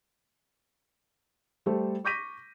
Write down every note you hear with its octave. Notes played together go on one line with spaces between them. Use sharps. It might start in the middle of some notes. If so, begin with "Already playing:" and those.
G3 A3 A4 C5
C#6 D6 G6 A#6 B6 D#7